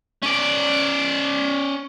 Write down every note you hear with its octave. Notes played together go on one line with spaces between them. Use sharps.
C#4 D5